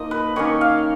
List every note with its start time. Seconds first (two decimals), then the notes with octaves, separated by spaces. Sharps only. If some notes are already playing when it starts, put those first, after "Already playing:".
Already playing: F3 A#3 D#4 D#5
0.11 B4
0.36 D#3 A#3 C#4 C#5
0.61 F5